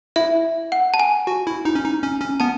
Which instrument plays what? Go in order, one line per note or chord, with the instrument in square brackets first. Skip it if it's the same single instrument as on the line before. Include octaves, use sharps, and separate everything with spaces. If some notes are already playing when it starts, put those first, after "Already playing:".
[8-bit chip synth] E4 [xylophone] E5
[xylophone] F#5
A5
G#5
[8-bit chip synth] F#4
E4
D#4
C#4
D#4
C#4
C#4
[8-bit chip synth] B3 [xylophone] A5